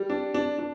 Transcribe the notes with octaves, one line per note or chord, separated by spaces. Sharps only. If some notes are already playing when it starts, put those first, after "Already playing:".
Already playing: G3
D4
D4
D4